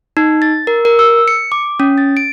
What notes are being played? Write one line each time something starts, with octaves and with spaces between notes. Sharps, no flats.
D#4
A6
A#4
A#4
E6
C#7
D6
C#4
A6
D7